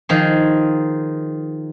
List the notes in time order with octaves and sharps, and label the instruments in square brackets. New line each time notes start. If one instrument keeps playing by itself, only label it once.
[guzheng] D#3 F3 G#4